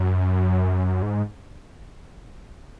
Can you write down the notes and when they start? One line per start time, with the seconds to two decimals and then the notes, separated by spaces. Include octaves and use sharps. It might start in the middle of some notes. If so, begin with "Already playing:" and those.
Already playing: F#2
1.02 G#2